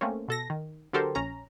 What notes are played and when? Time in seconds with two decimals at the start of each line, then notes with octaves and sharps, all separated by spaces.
0.01 A3 A#3 C4 C#4
0.28 B2 A4 A#6
0.50 D#3
0.93 D3 F#3 G4 A4 A#4 C5
1.15 A#1 C#4 A#5